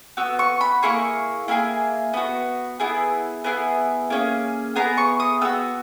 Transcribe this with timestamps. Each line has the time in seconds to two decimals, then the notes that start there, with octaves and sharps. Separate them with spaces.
0.17 B3 F#4 E6
0.39 C#6
0.61 B5
0.83 A#3 E4 G#4 C#6
1.48 A#3 E4 G#4
2.14 B3 F#4
2.80 B3 E4 G#4
3.44 B3 E4 G#4
4.10 A#3 C#4 G#4
4.76 B3 E4 G#4 A#5
4.97 C#6
5.20 D#6
5.41 B3 F#4 E6